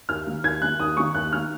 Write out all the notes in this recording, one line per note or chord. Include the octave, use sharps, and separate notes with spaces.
D#2 F6
D#3 A#3
D#2 G#6
D#3 A#3 F#6
D#2 D#6
D#3 A#3 C#6
D#2 F#6
D#3 A#3 F6